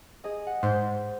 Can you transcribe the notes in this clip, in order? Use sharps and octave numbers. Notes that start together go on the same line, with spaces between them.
G#4 D#5
F#5
G#2 C5 G6